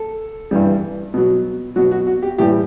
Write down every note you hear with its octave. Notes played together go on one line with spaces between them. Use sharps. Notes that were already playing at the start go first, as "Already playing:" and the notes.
Already playing: A4
G2 E3 G3
B2 F#3
B2 F#3 F#4
F#4
F#4
G4
A2 E3 G3 G4